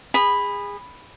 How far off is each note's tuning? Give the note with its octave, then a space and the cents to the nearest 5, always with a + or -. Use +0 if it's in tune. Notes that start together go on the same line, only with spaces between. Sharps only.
G#4 -25 B5 +0